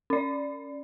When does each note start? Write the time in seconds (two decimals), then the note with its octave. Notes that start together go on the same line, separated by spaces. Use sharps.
0.10 C#4 D5